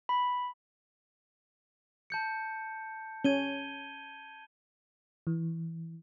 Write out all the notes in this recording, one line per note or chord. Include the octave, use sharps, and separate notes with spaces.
B5
A5 G6 C#7
C#4 G#6 D#7 G7
E3